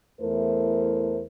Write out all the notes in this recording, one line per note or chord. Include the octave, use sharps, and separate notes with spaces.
E2 A3 E4 A#4 C5